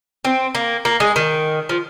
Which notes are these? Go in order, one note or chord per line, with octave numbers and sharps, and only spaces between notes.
C4
A#3
A#3
G#3
D#3
F3